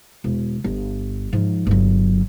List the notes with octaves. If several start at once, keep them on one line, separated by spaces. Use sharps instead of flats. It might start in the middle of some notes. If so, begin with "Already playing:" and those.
E1
G1
G#2 F3
G1 F#3